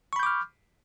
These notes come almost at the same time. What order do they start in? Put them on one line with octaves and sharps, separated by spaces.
C#6 B5 G6 D6 F6